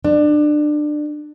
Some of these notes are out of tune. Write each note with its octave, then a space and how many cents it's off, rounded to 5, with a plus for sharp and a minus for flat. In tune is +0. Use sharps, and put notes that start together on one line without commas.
D4 +25